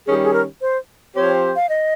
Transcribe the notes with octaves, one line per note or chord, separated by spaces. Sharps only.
D#3 G3 C#4 G4 G#4
G#4
A#4
C5
F3 C4 G4 C5 C#5
F5
D#5